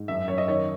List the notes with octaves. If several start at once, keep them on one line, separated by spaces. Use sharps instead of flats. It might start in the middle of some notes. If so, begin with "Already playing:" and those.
Already playing: G#2
F#2 E5
F#2 C#5
D#5
D#3 C#5